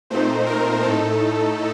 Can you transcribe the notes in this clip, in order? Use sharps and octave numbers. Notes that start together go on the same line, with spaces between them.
A#2 A3 C4 D#4 C5
A#4
A2 A3 D#4 A4